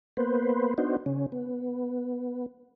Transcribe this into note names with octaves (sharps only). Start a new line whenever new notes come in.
A#3 B3 B4 C5
B3 D4 D#4 F#4 C5
C#3 C#4
B3